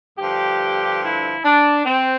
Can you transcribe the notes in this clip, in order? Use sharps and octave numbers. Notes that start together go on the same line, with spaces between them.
G2 D3 F3 G4
E4
D4
C4